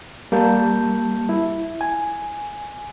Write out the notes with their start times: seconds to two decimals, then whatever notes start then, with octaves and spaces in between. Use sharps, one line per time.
0.32 G3 A#3 A5 G6
1.29 E4
1.81 G#5